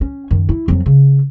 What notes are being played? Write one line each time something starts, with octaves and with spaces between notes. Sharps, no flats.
C#4
F#2 D#3
E4
F2 F#3
C#3